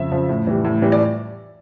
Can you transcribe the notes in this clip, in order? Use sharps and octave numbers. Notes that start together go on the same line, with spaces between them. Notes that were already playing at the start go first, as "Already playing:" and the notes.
Already playing: F2 C#3 F3 E5
C#3 F3
A2
E3 G3
A2
E3 G3
D5